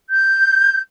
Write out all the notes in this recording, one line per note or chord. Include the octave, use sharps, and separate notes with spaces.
G6